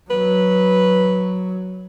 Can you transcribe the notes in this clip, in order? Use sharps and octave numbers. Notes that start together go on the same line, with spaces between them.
F#3 B4